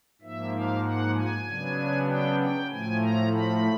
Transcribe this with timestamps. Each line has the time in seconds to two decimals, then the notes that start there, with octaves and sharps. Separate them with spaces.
0.21 G#2 F3 A#3 E5
0.53 F5
0.83 F#5
1.15 G#5
1.46 C#3 F#3 B3 D4
2.08 G5
2.39 G5
2.69 A2 F3 A3 G#5
3.01 A#5
3.32 B5